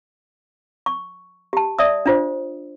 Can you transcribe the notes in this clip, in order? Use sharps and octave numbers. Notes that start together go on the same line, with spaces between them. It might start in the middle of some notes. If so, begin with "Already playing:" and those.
C#6
G4 A5
D5 E5 D#6
D4 F4 C5